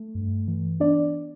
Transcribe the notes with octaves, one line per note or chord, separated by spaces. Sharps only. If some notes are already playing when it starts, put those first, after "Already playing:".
Already playing: A3
G2
E3
B3 D4 D5